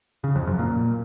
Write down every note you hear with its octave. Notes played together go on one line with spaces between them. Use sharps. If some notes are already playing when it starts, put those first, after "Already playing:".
C#3
F2
F#2
A#2